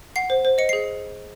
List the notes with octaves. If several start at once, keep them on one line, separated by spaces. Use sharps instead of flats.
F#5 C7
C5
C5
D#5 C#7
G#4 C7